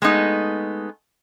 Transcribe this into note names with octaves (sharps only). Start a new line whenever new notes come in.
G#3 A3 B3 D#4